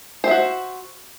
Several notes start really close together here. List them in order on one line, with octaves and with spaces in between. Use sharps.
C5 E5 F#4